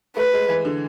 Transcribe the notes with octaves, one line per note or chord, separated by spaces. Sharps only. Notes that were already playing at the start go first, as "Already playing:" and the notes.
A3 B4
G#3
E3
D3